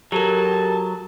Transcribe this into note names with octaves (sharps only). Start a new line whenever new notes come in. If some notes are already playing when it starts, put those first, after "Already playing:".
F#3 G4 A4 A#4 A5